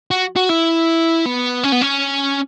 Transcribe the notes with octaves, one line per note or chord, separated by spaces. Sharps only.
F#4
F#4
E4
B3
C#4
B3
C#4